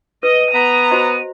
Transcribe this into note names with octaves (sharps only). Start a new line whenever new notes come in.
B4 D#5 D#7
B3 A#5
F#4 C5 D#5